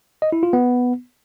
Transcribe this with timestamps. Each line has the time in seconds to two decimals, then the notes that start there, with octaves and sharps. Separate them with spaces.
0.22 D#5
0.32 E4
0.43 F4
0.53 B3